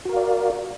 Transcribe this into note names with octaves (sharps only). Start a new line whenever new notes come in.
F#4 A#4 D5 F5